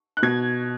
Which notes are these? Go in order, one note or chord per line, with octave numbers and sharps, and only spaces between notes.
F#6
B2 G#6